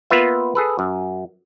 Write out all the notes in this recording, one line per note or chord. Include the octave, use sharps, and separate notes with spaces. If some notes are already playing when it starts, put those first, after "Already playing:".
A#3 B3 F4 B4 E5
G#4 A4 B4
F#2